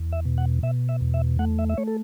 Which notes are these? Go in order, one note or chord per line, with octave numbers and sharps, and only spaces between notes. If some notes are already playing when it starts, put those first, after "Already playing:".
Already playing: E2
E5
B2
F#5
B2 E5
E5
E2
E5
A3 F#5
E5
E5
A3 C#5
A4